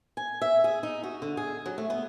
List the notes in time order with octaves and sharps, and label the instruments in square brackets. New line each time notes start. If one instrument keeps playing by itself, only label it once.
[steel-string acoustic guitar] G#5
E5
G#4
D#4
F#4
D3
G#4
F#3
A3
B3